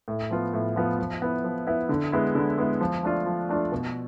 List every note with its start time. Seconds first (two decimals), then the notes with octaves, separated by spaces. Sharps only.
0.08 A2
0.31 F3 B3 F4
0.53 A2
0.76 F3 B3 F4
0.99 F3
1.22 B3 E4
1.44 F3
1.67 B3 E4
1.89 D3
2.12 G#3 B3 E4
2.35 D3
2.58 G#3 B3 E4
2.81 F3
3.03 A3 D4 F4
3.26 F3
3.49 A3 D4 F4
3.72 B2